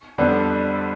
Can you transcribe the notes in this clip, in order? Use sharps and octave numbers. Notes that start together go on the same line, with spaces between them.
F2 D3 G3 B3 D4